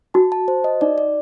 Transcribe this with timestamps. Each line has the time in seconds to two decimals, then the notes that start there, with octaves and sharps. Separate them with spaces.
0.14 F#4 A5
0.32 A5
0.48 C5
0.64 D#5
0.81 D#4 D5
0.98 D5